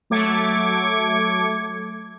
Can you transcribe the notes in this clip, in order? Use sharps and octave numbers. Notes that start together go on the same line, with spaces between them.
F#3 A3 D6 G#6 C#7